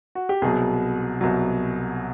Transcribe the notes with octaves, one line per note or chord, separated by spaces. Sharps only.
F#4
G4
C2 B2 F#3 G#4
C2 B2 F#3